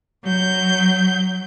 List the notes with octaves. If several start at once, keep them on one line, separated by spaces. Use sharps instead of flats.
F#3 G6